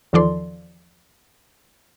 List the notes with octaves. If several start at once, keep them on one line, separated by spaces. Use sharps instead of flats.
E2 D#3 F3 A4 D5 C6